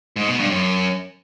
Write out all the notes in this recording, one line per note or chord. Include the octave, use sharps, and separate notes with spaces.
G#2
B2
G2
F#2